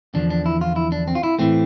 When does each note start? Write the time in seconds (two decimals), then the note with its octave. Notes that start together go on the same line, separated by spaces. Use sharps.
0.14 E2 D3 F3 D4
0.30 D4
0.46 E4
0.61 F4
0.76 E4
0.92 D4
1.08 C4
1.15 F4
1.23 E4
1.39 A2 E3 A3 C4